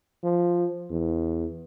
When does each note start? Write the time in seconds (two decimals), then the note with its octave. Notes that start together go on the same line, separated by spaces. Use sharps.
0.23 F3
0.91 E2